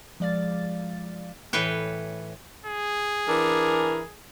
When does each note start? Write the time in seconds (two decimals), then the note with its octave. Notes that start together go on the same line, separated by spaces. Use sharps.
0.20 F3 G#3 D5 F5 A6
1.53 A2 E3 B4 C#5 G5
2.66 G#4
3.28 E3 D4 A#4